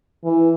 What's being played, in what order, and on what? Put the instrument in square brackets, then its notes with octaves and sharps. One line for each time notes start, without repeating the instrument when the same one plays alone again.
[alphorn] E3